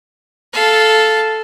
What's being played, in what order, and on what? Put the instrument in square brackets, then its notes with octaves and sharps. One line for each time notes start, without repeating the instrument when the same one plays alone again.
[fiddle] A4 F5